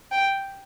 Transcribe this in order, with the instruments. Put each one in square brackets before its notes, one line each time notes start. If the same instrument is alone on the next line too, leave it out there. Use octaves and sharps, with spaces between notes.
[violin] G5